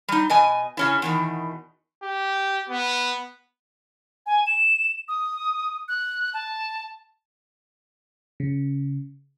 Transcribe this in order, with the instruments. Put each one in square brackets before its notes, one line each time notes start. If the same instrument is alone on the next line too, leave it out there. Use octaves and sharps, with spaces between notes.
[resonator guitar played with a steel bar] G3 D#4
B2 D#5 G#5
C#3 C#4 E4
E2 B2 D#3
[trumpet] G4
B3
[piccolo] G#5
E7
D#6
F#6
A5
[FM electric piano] C#3